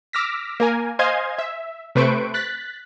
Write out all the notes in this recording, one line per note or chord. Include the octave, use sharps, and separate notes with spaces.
D6 E6 F6 A#6 B6
A#3 A#4 G#5
C5 D#5 F5 G#5 C6 G#6
E5
C3 A3 B4 C5 C#6 D7
F#6 A6 B6